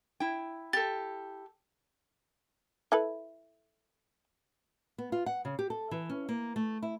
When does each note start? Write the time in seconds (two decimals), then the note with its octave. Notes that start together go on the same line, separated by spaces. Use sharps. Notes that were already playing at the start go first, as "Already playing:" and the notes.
0.20 E4 G5
0.73 G4 A4 A6
2.92 E4 A4 B4
4.98 B3
5.12 F4
5.26 F#5
5.45 C#3
5.59 G4
5.70 A4
5.91 E3
6.10 C#4
6.29 A#3
6.56 A3
6.83 E4